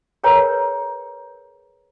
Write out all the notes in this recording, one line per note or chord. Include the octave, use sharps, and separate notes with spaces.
G#4 A#4 B4 C#5 G5 A#5